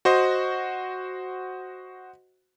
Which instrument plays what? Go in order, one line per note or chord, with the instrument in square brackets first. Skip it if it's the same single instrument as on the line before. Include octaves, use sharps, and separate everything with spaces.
[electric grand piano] F#4 C5 D#5